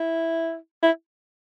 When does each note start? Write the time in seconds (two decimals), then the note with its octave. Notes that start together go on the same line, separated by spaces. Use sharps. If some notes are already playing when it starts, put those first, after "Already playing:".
Already playing: E4
0.83 E4